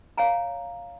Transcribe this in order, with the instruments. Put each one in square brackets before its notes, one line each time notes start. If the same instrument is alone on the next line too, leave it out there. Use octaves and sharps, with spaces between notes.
[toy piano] C#5 F5 G#5 A#5